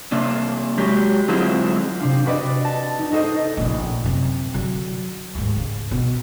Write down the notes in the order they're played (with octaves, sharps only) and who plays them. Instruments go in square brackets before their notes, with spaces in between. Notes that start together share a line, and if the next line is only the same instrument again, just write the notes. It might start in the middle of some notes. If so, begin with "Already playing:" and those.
[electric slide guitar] C3 A#3 D4
F#3 G#3 G4
D3 F#3 G#3 C4 E4 F4
[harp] C3 C4 D4 F5
D4 F#4 B4 D5 D#5
A5
D#4
D#4 F#4 A4 C5 D#5
[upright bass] A#1 C#3
F#2 C3
D3 F#3
D#2 G#2
C#3
B2